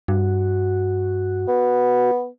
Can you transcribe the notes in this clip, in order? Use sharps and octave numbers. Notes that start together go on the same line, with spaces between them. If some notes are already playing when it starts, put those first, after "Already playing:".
G2 F#4
B3